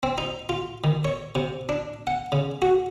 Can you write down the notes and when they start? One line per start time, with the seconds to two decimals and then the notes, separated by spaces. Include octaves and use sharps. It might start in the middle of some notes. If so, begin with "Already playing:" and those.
0.03 C4
0.18 D#4
0.49 F4
0.84 D#3
1.05 C#5
1.35 C3
1.69 D4
2.07 F#5
2.32 C#3
2.62 F#4